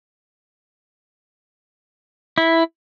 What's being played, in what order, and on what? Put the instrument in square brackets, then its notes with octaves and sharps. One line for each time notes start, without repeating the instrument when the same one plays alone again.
[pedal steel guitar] E4